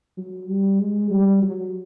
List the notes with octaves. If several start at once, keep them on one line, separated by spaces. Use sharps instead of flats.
F#3
G3
G#3
G3
F#3